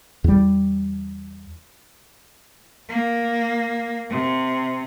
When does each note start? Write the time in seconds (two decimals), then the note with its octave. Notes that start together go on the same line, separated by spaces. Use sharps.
0.24 E2 G3
2.89 A#3
4.10 C3